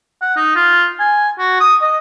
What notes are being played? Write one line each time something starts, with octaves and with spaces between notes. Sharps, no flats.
F#5
D#4
F4
G#5
F#4
D#6
D#5